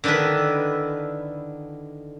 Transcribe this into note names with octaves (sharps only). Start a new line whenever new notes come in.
D3 D#3 D4 E4 B4